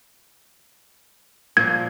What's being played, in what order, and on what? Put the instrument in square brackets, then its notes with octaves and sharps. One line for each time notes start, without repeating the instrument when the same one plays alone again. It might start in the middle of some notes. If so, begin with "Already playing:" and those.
[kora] A#2 F3 [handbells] G#6